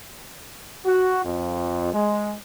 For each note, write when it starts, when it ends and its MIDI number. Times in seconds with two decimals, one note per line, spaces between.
0.86 1.22 66
1.25 1.92 41
1.94 2.34 56